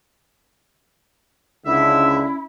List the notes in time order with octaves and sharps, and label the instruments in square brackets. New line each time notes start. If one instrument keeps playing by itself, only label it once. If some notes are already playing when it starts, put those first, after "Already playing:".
[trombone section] C#2 D3 [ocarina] C#4 [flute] E4 [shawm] E5